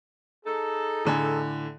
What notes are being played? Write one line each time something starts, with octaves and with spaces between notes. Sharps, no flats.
D#4 G#4 A4
A2 D3 G#5